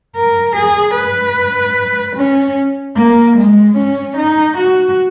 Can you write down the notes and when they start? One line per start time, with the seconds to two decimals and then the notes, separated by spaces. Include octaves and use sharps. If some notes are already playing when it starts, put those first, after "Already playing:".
0.16 A#4
0.56 G#4
0.96 B4
2.16 C#4
2.97 A#3
3.37 G#3
3.77 C#4
4.17 D#4
4.57 F#4